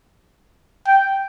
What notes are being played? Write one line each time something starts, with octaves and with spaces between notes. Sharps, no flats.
G5